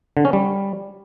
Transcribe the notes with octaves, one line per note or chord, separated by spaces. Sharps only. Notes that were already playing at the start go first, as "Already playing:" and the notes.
D3
C#4
G3